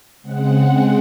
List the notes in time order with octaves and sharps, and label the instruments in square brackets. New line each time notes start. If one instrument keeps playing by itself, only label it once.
[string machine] C#3 G#3 C4 F#5